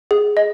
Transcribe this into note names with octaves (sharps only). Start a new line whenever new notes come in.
G#4
D#5